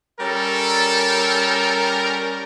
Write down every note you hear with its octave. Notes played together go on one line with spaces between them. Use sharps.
G3 C#4 A4 A#4